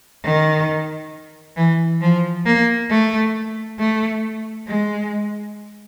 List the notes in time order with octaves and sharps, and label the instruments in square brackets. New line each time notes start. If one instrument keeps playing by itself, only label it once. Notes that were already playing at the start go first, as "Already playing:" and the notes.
[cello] D#3
E3
F3
A#3
A3
A3
G#3